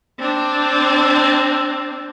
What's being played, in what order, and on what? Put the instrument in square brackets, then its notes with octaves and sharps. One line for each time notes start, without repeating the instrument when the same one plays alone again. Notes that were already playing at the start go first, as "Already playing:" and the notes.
[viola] C4 D4